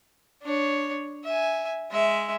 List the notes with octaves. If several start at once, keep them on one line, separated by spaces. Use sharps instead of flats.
D4 C#5
E5 G#5
G#3 E5